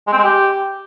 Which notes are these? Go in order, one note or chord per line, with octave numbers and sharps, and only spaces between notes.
G#3
C4
G#3
G4